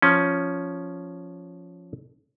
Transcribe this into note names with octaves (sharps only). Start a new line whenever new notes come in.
F3 C#4